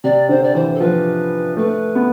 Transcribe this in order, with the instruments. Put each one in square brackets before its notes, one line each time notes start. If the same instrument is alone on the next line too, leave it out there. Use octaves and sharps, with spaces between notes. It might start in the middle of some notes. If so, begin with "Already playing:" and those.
[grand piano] C3 [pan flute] D5
[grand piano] D3 [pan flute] C5
[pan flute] D5
[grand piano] E3 [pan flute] C5
[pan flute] A4
[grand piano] F3 [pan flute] B4
[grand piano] A3 [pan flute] B4
[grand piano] B3